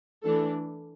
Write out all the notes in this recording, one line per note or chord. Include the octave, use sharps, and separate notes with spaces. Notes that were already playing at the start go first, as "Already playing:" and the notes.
E3 A3 D4 A4